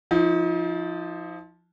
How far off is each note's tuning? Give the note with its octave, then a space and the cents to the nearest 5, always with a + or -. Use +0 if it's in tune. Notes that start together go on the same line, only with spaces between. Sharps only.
F3 +0 D#4 +40